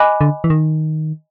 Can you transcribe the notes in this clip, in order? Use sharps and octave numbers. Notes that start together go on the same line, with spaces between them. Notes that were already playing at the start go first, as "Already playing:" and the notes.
Already playing: D#5 G#5 B5 D6 F#6
D3
E3
D#3